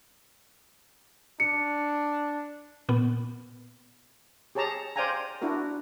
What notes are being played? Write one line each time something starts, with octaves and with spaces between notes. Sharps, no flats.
D4 C#7
A#2 B3
G4 G#4 C#5 A5 A#5
C5 D5 F5 G5 G#5 A#5
D4 E4 F#4 A#4